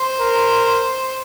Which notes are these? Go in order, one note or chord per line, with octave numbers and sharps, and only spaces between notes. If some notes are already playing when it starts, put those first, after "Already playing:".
Already playing: C5
A#4